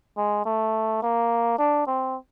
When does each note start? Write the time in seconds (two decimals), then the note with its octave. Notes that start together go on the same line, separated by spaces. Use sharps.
0.17 G#3
0.46 A3
1.02 A#3
1.59 D4
1.87 C4